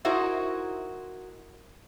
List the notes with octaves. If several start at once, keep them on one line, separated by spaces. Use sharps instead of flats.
D#4 E4 F#4 A#4 C5